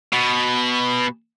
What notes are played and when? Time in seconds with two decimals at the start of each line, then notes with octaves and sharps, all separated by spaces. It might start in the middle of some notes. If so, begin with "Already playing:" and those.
0.13 B2